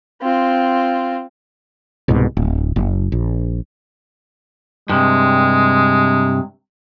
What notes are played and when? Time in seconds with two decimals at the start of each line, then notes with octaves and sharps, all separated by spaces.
0.22 C4 F4
2.08 C2 G#2 B2
2.37 D1
2.76 F#1
3.12 A#1
4.89 G2 C3 G#3